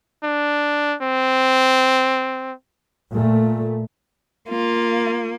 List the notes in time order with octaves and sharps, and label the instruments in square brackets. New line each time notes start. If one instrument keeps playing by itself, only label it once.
[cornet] D4
C4
[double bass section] A#2 A3
[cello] A#3 [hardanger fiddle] F4